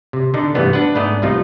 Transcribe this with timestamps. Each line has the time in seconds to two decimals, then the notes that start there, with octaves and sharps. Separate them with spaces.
0.13 C3
0.34 D3 D4 D#4
0.55 G2 C3 E3 A3 B3 C4
0.73 D4 B4 F#5
0.95 G#2 A3 B3 D5 D#5
1.22 C2 C3 F3 A3 D#4 F4